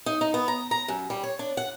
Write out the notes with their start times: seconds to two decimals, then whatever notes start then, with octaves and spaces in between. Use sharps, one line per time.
0.06 D#4
0.21 D#4
0.34 B3
0.48 A#5
0.71 A#5
0.88 F#2
1.10 G3
1.23 C#5
1.39 D4
1.57 F#5